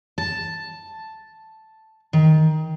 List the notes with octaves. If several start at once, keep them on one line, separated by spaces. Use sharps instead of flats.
A5
D#3